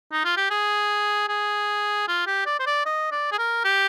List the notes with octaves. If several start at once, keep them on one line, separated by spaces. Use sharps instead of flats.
D#4
F4
G4
G#4
G#4
F4
G4
D5
C5
D5
D#5
D5
G#4
A#4
G4